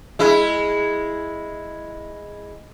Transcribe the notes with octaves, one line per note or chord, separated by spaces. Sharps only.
G#3 E4